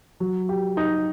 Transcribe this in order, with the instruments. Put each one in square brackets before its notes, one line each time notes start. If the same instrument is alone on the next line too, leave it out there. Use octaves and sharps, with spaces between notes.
[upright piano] F#3
G4
D#4